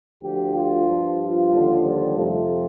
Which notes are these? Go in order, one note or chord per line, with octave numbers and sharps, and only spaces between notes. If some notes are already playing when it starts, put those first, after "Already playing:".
D2 D3 F3 G4
F4
G2 F3
F4
D#2 D3 F3
G3
F2 C3 F3 A3